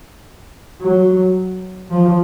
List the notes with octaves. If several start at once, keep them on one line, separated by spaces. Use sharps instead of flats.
F#3
F3